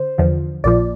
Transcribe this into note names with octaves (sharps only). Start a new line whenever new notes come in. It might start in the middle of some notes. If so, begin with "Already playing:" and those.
Already playing: D3 C5
E2 D3 F3
A#1 A#2 F3 D5